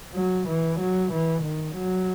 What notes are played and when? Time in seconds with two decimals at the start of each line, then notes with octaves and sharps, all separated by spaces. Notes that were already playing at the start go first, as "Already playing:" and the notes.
0.15 F#3
0.48 E3
0.80 F#3
1.12 E3
1.43 D#3
1.76 F#3